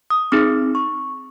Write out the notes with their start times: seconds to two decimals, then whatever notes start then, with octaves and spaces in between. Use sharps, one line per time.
0.10 D#6
0.32 C4 D#4 G#4 D6
0.75 C#6